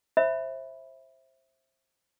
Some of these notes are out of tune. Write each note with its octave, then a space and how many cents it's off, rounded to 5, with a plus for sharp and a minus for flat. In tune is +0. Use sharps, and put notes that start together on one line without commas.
C5 +20 E5 +0 B5 +0